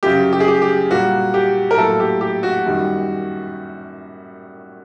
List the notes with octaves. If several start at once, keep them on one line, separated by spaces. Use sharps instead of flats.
F#2 C#3 F#3 G4
G4
G#4
G4
G4
A#2 G3 A#3 F#4
G4
A#4
A2 F#3 A#3 A4
G4
G4
F#4
F#2 D#3 G3